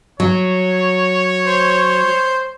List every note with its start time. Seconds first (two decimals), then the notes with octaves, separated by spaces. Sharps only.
0.20 F#3 C#5
1.47 C5